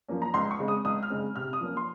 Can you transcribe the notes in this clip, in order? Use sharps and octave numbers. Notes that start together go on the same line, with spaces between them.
F3 A#3 C#4
A#5
C#2 C6
C#6
C#3 G#3 C4
D#6
C#2 D#6
F6
C#3 G#3 C4
C3 F6
D#6
F3 A#3 C#4
C6